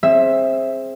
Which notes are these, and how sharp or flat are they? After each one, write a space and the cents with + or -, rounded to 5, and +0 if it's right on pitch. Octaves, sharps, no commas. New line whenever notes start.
C4 +20 G#4 +0 E5 +0